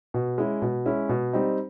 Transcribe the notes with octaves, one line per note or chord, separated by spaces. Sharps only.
B2
G#3 C#4 E4
B2
G#3 C#4 E4
B2
G3 C4 D#4